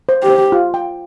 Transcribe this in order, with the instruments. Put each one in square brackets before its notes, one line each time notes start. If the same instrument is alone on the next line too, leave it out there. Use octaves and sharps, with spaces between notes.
[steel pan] C5
[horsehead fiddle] G4
[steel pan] C5
F4
G5